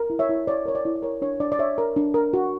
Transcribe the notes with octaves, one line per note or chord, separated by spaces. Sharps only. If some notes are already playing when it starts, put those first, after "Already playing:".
Already playing: A#4
E4
C#5 E5
E4
C#5 D5
A#4 C#5
D5
E4
D5
A#4 C#5
D4 C#5
D4 D5
D5
C#5 E5
A#4
D4
A#4
F#4